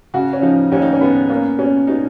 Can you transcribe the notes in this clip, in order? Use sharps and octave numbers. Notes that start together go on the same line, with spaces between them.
C#3 F#4
C#4
F3 D#4
D#2 C#4
D#4
C#4
B3
A#3 C#4
B2 C#4
B2 D#4